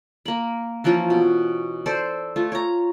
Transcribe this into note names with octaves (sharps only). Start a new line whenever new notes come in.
A#3 B5
E3 F3 A#3 C#4
B2
A4 C5 D5
A3 F4
C#5 A#5